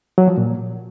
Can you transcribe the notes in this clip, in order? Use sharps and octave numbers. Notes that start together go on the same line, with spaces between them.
F#3
F3
A#2